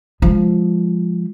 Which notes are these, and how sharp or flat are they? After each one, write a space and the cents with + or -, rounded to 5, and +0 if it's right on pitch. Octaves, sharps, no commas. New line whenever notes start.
F3 +0 G#3 -10